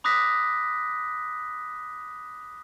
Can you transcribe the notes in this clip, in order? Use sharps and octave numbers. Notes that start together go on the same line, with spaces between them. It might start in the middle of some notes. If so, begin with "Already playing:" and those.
B5 D6 D#6 F#6 A#6 B6